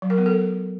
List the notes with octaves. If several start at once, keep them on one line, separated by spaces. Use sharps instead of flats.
F#3
A#4
B3
A4